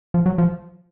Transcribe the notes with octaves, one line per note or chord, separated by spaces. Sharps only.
F3
F#3
F3